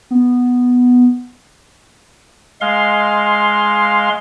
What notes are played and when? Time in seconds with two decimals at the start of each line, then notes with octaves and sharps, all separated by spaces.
0.11 B3
2.61 G#3 F5 C6